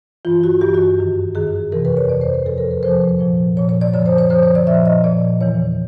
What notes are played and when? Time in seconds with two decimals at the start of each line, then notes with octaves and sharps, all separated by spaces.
0.25 G2 E3 F4
0.43 F#4
0.61 G2 E3 G4
0.74 F#4
0.99 F#2 D#3
1.35 F#2 D#3 G#4
1.72 F2 C3 E3 A#4
1.85 B4
1.97 C#5
2.09 F2 C3 E3 D5
2.21 C5
2.34 B4
2.46 E2 C3 F3 A4
2.58 A#4
2.71 B4
2.83 E2 C3 F3 C5
3.19 A#2 F3
3.57 A#2 F3 C#5
3.69 C#5
3.81 D5
3.94 F#2 D3 F3 C#5
4.06 C5
4.18 C#5
4.30 F#2 D3 F3 C5
4.43 C#5
4.55 D5
4.67 A#2 F3 E5
4.86 D#5
5.04 A#2 F3 D5
5.41 E2 C#3 E3 C#5